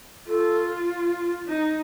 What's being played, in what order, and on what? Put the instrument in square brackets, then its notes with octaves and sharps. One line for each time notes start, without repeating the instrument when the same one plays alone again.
[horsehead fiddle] F4 [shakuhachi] A4
[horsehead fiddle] D#4